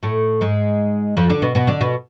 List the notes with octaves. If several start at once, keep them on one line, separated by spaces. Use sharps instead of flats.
A2 A3
G#2 G#3
F2 F3
D3 D4
B2 B3
B2 B3
D3 D4
B2 B3